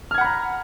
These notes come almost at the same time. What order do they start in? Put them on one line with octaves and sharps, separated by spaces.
F6 G#6 F#5 B5 A#5